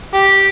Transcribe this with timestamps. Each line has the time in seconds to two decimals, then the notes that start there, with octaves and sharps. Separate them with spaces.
0.14 G4